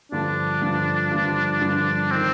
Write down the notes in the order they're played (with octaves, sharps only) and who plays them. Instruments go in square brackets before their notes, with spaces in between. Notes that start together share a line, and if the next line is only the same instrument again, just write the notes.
[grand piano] G2 D3 F3 [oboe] D4
[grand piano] G2 D3 F3
G2 D3 F3
G2 D3 F3
[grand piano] D#3 [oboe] C4